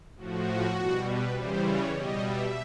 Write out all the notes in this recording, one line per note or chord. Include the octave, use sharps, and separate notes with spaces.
A2 F3 F#4
B2 G3
B4
C#3 E3 G3 C5
C#5
B2 G3 D#5
E5